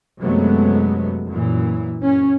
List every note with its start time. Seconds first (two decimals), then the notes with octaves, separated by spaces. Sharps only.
0.21 F#2 C3 F#3 G#3 A3 B3
1.29 F#2 A#2 E3
2.03 F#2 C#4